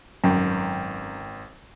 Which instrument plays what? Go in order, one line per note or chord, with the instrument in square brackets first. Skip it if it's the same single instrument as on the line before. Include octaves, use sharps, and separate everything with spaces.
[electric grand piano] G#1 G5 [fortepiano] F#2